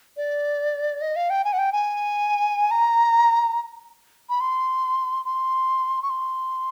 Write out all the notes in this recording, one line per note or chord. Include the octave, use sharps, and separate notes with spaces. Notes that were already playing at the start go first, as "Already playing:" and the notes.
D5
D#5
F5
G5
G#5
F#5
G5
G#5
A#5
B5
C6
C6
C#6
C6